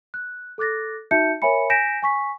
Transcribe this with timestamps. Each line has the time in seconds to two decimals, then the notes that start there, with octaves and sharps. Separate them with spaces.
0.14 F#6
0.58 A4 D6 F#6 A6 A#6
1.11 D#4 F#4 E5 A5 G6 C#7
1.42 A#4 C#5 E5 G#5 B5 C#7
1.70 G#5 G6 A#6 B6 D7 E7
2.03 G#5 C#6 B6